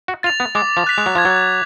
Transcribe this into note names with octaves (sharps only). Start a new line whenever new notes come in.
F#4
F4 A6 F7
B3
G#3 D6
F3
F#6 B6 F7
G#3
F#3
F3 G#6
F#3